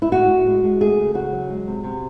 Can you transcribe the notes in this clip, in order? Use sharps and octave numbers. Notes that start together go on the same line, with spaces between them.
E4
A2 F#4
A2
G#3
G#3
A3 G#4
C#3
C#3 F#4
F#3
G#3
C3
C3